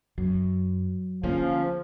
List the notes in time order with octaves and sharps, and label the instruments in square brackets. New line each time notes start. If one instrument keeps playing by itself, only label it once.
[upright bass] F#2 [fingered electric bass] F#3
[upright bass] D3 [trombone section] F3 [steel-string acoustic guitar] A#3 C#4 G#4